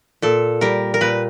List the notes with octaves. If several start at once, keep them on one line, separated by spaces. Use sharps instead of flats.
A#2 A4
G3 A#4
A#4
A#2 B4